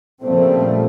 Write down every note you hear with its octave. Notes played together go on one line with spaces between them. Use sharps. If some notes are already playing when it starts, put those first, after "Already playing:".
A#2 C#3 F3 G3 A3 C4